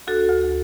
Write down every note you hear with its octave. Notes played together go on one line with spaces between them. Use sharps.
D2 F#4 A4
D2